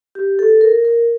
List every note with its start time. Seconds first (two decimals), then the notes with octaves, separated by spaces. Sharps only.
0.15 G4
0.39 A4
0.61 A#4
0.85 A#4